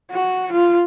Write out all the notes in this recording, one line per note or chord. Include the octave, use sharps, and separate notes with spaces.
F#4
F4